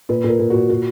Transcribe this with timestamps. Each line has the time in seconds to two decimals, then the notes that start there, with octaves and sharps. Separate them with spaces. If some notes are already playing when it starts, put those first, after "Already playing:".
0.09 A#2 B4
0.24 A#2 A#4
0.39 A#2
0.50 A#2 F#4
0.70 A#2 F#4